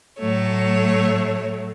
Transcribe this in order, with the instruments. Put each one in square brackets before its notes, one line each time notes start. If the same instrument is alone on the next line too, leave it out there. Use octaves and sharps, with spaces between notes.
[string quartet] A2 F#3 A3 C#5